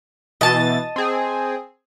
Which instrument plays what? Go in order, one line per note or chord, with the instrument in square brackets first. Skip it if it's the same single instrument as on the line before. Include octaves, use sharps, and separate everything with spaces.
[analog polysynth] B2 E3 A6 [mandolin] D#5 A5
[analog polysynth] C4 G#4